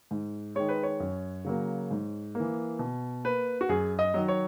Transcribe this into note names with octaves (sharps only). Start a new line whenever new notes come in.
G#2
D#3 G#3 C#5
B4
C#5
F#2
C#3 F#3 A#3
G#2
E3 A#3
B2
A#3 B4
F#4
F#2 G#4
D#5
D#3 F#3
C#5